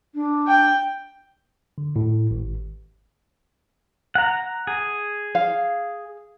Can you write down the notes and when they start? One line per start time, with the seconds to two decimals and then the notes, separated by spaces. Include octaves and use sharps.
0.14 D4
0.48 G5
1.78 D3
1.96 A2
2.31 G#1
4.15 F#5 A#5
4.67 G#4
5.35 F5